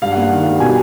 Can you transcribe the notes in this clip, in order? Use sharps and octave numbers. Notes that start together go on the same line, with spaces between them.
G2 F5
F#5
A#3
F#5
D#3
G3
B2 G#5